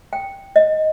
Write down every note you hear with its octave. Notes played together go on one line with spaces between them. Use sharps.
G5
D#5